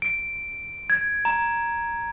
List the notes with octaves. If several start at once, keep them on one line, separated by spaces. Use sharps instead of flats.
D7
G#6
A#5